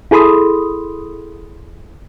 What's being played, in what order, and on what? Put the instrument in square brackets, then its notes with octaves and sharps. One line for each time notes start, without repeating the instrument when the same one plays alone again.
[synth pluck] E4 G#4 A4 B5 C6 D#6